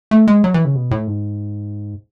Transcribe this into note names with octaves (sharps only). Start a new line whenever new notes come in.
A3
G#3
F#3
E3
C#3
B2
A2
G#2